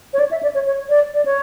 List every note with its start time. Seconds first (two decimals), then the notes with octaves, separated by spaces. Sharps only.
0.13 C#5
0.19 D5
0.31 E5
0.43 D5
0.55 C#5
0.67 C#5
0.89 D5
1.14 D5
1.25 C#5